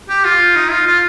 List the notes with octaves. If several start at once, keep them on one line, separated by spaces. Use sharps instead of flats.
G4
F4
D#4
F4
F4